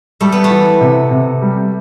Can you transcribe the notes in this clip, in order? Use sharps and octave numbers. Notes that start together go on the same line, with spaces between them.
G3 A3
B3
A3
E3
C3
C3
G3